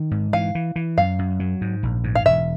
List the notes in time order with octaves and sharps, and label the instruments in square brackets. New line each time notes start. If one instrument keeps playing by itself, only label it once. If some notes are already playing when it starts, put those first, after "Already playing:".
Already playing: [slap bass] D#3
G#2
[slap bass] E3 [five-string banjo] F5
[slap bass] E3
E3
[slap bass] F#2 [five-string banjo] F5
[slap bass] F#2
F#3
G#2
A#1
G#2
[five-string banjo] F5
[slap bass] E1 [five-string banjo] E5